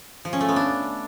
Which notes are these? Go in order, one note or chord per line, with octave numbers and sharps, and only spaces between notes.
F3
C#4
A3
B3
D4